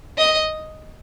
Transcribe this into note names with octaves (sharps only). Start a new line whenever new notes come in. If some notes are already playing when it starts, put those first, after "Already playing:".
D#5